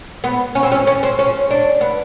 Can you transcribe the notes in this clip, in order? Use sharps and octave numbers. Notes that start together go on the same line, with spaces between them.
B3
C#4
C4
C#4
C#4
C4
C#4
D4
B3